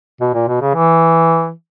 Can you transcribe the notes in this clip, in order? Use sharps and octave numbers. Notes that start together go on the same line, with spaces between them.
B2
A#2
B2
C#3
E3